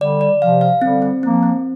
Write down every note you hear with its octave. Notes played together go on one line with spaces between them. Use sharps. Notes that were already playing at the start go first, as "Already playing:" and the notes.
D3 G3 D5
D5
C3 F3 F5
F5
D3 G3 C4
C4
F3 A#3 C4
C4